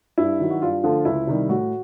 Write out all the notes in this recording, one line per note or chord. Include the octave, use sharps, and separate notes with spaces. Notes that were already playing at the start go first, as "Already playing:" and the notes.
G2 E4
D#3 F#3
F#4
G2 F4
D3 F3 A3
C#2 E4
C3 D#3 G3
A2 F#4